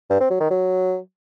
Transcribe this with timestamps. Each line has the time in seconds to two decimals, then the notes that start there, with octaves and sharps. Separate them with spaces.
0.10 G2
0.20 C4
0.30 F#3
0.40 D#3
0.50 F#3